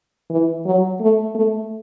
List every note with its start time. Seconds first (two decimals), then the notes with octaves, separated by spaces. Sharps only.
0.30 E3
0.65 F#3
1.00 A3
1.35 A3